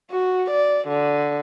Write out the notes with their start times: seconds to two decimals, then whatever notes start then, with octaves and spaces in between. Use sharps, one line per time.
0.11 F#4
0.51 D5
0.88 D3